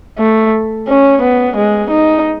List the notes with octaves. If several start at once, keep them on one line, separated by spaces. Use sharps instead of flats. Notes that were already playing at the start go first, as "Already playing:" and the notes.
A3
C#4
B3
G#3
D#4